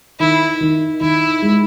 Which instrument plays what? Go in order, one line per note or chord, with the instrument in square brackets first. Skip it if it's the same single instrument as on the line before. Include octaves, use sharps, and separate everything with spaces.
[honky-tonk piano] D#3 [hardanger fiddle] E4
[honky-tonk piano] D#3
[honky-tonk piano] D#3 [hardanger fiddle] E4
[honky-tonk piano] G#3